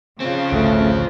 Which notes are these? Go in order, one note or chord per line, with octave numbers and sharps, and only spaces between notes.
C#3 C4 F4
A1 D2 A3